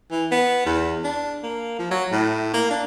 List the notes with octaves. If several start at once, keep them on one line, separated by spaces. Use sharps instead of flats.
E3
B3
E2
D4
A#3
F3
F#3
A2
A#3
D4